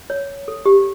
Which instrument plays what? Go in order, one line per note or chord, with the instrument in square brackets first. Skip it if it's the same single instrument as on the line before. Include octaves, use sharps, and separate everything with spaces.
[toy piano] C#5
A4
G4